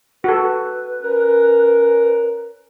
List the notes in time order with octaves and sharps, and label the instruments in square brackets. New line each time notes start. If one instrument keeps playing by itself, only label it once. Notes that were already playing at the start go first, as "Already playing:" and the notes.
[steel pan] F#4 A4 [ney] B4
[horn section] C#4 A#4